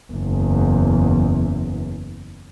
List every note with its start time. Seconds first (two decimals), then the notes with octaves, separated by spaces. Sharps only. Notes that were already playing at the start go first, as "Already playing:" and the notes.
0.13 F#1 E2